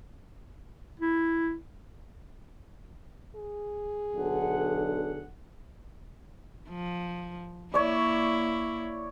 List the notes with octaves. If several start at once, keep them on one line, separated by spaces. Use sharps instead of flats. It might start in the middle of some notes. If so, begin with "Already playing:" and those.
E4
G#4
B1 D3 F#5
F3
A#3 E4 C#5 D5